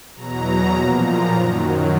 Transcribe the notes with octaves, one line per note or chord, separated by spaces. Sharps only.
E2 B2 F#3 A#5
A#2 F3
A#5
F#2 D#3 F#3